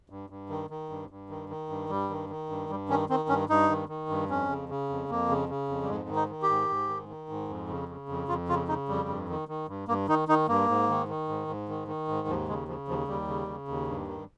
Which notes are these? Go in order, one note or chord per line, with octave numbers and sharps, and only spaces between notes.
G2
G2
D#3
D#3
G2
G2
D#3
D#3
G2
G2 G3
D#3
D#3
G2
G2 G3
D#3 C#4
D#3 C4
G2 C#4
G2 D#4
D#3
D#3
G2
F2 C#4
C#3
C#3
F2
F2 A#3
C#3
C#3
F2
G3
G#2 G#3
D#3
D#4
D#3
G4
G#2
G#2
D#3
D#3
G#2
F2
C#3
C#3
F2
F2 F4
C#3 F4
C#3 D#4
F2 G3
G2
D#3
D#3
G2
G2 A#3
D#3 D#4
D#3 D#4
G2 A#3
G#2
D#3
D#3
G#2
G#2
D#3
D#3
G#2
D#2 F3
C#3 G#3
C#3 F3
D#2 F3
D#2 G3
C#3
C#3
D#2
G2
D#3